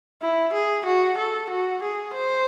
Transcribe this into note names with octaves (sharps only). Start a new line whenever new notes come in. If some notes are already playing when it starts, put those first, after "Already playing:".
E4
G#4
F#4
A4
F#4
G#4
C5